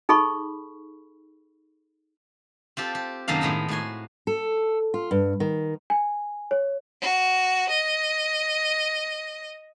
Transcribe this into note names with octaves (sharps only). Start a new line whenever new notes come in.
D#4 G#4 A4 B5 C#6
C4 F4 G4 A4
G4
F#2 C3 D#3 A#3 A4 F5
A2 D#3 G#3 A3 B3
A2 F#4 G#5 C6
A4
F4
G2
D#3
G#5
C#5
F#4
D#5